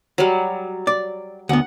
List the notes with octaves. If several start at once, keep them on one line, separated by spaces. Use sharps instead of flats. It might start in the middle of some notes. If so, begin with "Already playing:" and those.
F#3 G3
D5
D2 B3 F#5